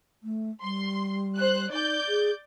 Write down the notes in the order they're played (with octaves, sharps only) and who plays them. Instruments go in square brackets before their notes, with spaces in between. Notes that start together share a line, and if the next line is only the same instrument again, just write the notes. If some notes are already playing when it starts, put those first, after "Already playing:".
[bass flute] A3
[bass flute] G3 [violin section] C6
[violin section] C5 F#6
[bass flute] D#4 [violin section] D5 G6
[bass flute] G#4